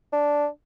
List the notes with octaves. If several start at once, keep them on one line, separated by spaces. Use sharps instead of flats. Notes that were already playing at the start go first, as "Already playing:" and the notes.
D4